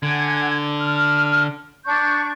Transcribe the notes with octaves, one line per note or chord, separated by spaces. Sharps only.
D3 F#5 G#5 G#6
F6
D4 C#6 G6